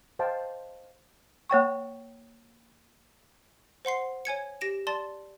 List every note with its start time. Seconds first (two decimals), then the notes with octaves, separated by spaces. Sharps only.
0.19 C5 D#5 F5 G5 A5
1.50 A#3 C#5 G5 C#6
3.85 C5 F#5 C6 C7
4.25 C#5 G#5 G#6 C#7
4.61 G4 A#6 D7 E7
4.87 D5 A5 C6 A6